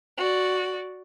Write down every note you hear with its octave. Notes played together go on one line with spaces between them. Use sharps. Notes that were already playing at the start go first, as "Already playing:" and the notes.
F#4 D5